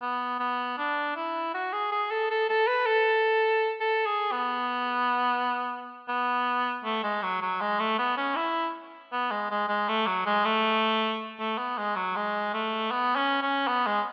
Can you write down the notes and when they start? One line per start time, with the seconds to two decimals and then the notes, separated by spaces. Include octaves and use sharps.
0.02 B3
0.39 B3
0.78 D4
1.16 E4
1.54 F#4
1.73 G#4
1.92 G#4
2.11 A4
2.30 A4
2.49 A4
2.67 B4
2.86 A4
3.81 A4
4.06 G#4
4.32 B3
6.09 B3
6.85 A3
7.03 G#3
7.23 F#3
7.41 F#3
7.61 G#3
7.80 A3
7.99 B3
8.17 C#4
8.36 E4
9.12 B3
9.31 G#3
9.51 G#3
9.69 G#3
9.88 A3
10.07 F#3
10.26 G#3
10.45 A3
11.40 A3
11.58 B3
11.78 G#3
11.96 F#3
12.16 G#3
12.54 A3
12.91 B3
13.16 C#4
13.42 C#4
13.68 B3
13.87 G#3